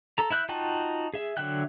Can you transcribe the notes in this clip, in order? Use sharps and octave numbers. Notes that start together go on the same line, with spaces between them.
A4 A#5
E4 E5 F#6 G6
D#4 F4 F#4 G5 A5
G#4 E5
D3 F#3 E5 G5 F#6